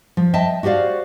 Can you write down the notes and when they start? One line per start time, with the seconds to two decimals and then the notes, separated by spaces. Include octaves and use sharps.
0.17 F3
0.33 D#5 E5 G5 A5
0.63 F#4 G4 C5 D5 F5